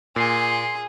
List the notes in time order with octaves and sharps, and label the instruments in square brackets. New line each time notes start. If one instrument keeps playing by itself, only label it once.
[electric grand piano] A#2 [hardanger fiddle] G#4 [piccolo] C6